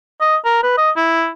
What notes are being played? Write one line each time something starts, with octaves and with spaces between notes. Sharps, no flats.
D#5
A#4
B4
D#5
E4